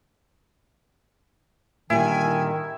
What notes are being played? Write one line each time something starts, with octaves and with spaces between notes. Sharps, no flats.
A#2 D3 D#3 G3 E4 G#5